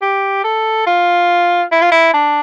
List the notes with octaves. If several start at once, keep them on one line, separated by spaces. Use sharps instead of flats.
G4
A4
F4
E4
F4
E4
D4